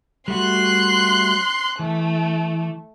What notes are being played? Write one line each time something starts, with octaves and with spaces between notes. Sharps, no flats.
G3 A3 F#4 C6 F#6
E3 A3